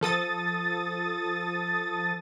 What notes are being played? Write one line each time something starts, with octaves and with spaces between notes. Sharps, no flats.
F3 A4 D#6 A6